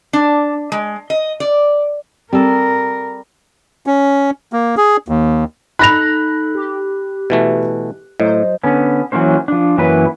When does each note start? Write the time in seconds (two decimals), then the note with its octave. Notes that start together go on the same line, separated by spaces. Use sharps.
0.13 D4
0.72 G#3
1.10 D#5
1.40 D5
2.33 G3 C4 A4 A#4
3.87 C#4
4.53 A#3
4.77 G#4
5.08 D#2
5.79 D#4 A4 B5 F#6 A#6 F7
6.55 G4
7.30 B2 E3 A3
8.20 A2 F#3 C5 D#5
8.63 D3 B3 C#4
9.12 E3 F#3 A#3 C#4 C5
9.48 F3 D4
9.78 F#2 E3 F#3 A#3 B4